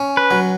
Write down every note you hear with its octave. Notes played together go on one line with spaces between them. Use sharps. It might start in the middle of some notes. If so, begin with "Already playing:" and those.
Already playing: C#4
B4
F#3